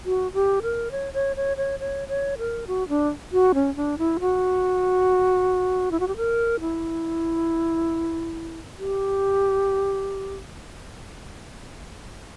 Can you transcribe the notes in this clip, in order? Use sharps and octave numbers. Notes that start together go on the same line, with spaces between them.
F#4
G4
A#4
C#5
C#5
C#5
C#5
C#5
C#5
A#4
F#4
D4
F#4
C#4
D4
E4
F#4
E4
F#4
G4
A#4
E4
G4